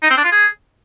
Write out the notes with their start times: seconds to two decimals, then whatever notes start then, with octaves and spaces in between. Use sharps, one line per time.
0.03 D#4
0.10 C4
0.17 D4
0.24 F4
0.32 G#4